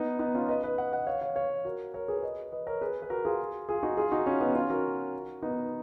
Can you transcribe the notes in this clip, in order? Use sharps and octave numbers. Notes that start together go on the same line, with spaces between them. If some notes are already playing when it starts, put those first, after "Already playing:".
Already playing: B3 D#4
B3 D#4
C#4 F4
B4 D#5
B4 D#5
D#5 F#5
D#5 F#5
C#5 F5
C#5 F5
C#5 F5
F#4 A#4
A#4 C#5
G#4 B4
B4 D#5
B4 D#5
A#4 C#5
G#4 B4
B4
F#4 A#4
F4 G#4
F4 G#4
D#4 F#4
F4 G#4
D#4 F#4
C#4 F4
B3 D#4
C#4 F4
F#4 A#4
B3 D#4